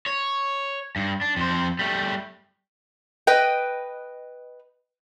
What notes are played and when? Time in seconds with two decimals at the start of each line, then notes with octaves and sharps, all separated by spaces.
0.06 C#5
0.96 G2
1.21 D4
1.36 F2 C5
1.79 G3 A3
3.27 B4 D#5 G5